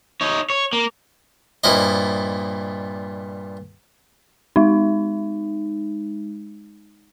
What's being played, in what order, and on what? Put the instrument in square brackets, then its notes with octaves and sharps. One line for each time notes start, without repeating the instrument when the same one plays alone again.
[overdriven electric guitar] D#4 C#5
C#5
A#3
[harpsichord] G2 A#2 F3 E4 D#5
[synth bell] G#3 D#4